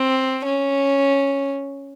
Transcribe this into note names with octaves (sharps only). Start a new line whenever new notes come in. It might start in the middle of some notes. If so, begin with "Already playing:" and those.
Already playing: C4
C#4